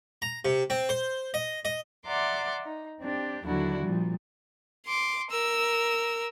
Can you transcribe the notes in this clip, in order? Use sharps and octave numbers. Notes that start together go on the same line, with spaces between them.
A#5
C3
C4
C5
D#5
D#5
D5 E5 F#5 A#5 C6 D6
D#4
C4 D4 G4
D#2 D3 F#3 D4 E4 F#4
A#2 F3 G3
C6 D6
A#4 E6